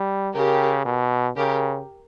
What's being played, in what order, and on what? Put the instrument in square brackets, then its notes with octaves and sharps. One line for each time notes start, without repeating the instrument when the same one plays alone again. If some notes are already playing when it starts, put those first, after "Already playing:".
Already playing: [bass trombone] G3
[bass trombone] C#3 [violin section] G4 A#4
[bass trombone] B2
[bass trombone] C#3 [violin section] G4 A#4